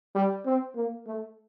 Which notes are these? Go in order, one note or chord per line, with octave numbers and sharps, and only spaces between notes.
G3
C4
A#3
A3